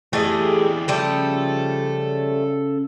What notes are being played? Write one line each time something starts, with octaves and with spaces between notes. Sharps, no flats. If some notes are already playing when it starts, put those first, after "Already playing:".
E3 A3 G4 G#4 D5 D#5
C#3 F3 G3 A3 A4 A5